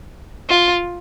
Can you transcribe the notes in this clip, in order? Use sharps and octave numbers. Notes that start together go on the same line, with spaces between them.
F4